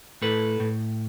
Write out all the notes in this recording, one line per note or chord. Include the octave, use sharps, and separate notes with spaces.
A2 A4 B4
A2